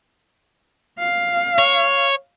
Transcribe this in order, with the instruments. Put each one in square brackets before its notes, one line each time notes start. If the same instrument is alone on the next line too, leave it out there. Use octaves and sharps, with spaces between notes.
[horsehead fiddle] F5
[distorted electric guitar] C#5